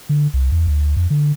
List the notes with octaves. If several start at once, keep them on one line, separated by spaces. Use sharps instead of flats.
D3
C2
E2
D2
F2
D3